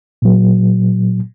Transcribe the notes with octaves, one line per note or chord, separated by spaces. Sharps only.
A#2 F#3